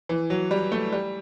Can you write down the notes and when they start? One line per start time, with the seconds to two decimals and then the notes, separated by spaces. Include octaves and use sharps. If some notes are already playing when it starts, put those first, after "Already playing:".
0.09 E3
0.30 F#3
0.51 G3
0.72 A3
0.92 G3